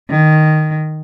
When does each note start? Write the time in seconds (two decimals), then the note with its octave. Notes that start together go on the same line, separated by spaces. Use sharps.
0.10 D#3